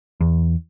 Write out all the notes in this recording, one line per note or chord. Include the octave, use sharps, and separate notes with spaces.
E2